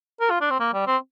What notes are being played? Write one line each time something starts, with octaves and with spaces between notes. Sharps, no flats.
A#4
F4
D4
C4
A#3
G3
C4